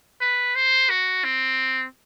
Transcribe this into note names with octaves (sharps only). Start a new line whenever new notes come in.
B4
C5
F#4
C4